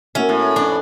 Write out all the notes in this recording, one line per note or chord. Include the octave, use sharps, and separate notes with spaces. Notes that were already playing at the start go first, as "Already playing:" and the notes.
A#3 C#4 F#4 E5
A2
F2 C4 D4 B4